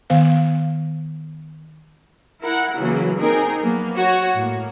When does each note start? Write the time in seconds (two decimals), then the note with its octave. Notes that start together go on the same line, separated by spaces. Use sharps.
0.10 D#3 B3 F5
2.42 E4 A#4 F#5
2.79 C#3 E3 F#3 A#3
3.17 A#3 C4 D#4 G#4 A#4
3.63 F#3 A#3 B3
3.97 F#4 C#5
4.36 A2 A#3